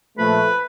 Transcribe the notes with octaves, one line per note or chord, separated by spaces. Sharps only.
A#2 F3 A3 B4